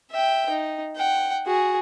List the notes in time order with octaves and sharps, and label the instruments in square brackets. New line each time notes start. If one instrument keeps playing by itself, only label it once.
[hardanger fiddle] E5 G5
D#4
F#5 G5
F#4 G#4